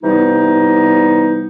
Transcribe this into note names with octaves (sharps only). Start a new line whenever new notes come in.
C3 E3 G3 B3 D#4